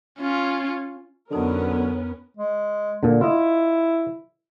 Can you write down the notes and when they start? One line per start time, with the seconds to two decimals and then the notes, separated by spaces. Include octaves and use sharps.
0.19 C#4 F4
1.31 F2 D3 F#3 B3 C#4 D#4 A#4 D#5
2.37 G#3
3.03 A#2 D3
3.21 E4 F4 D#5